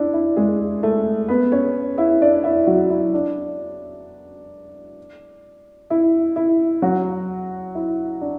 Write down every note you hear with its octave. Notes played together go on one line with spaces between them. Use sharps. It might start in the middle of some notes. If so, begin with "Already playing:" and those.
Already playing: D4 E4
E4
G#3 G#4
A3 A4
B3 B4
C#4 C#5
E4 E5
D4 D5
E4 E5
F#3 F#4
E4
D4
E4
E4
F#3 F#4
E4
D4